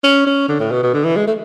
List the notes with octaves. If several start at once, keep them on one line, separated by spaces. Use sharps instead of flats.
C#4
C#4
D3
A2
B2
B2
D3
E3
G#3
A3